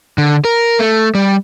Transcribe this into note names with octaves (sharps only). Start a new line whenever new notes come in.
D3
A#4
A3
G3